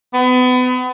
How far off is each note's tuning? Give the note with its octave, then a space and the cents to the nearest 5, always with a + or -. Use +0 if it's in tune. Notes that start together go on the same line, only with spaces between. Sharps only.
B3 +35